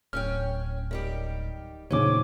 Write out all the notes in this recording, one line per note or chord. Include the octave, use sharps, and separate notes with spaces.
D1 C#4 C#5 G5 F6
D#3 G3 G4
D#2 A#2 C#3 F#3 C4 C#4 C#5 D6